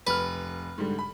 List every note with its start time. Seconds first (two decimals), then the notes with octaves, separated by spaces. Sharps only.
0.07 F1 B4 F6
0.78 G#2 D3 G3
0.99 B5